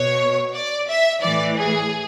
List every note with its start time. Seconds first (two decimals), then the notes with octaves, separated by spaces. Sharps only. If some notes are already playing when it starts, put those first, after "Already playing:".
Already playing: B2 C#5
0.54 D5
0.88 E5
1.22 A2 E3 D5
1.56 G#4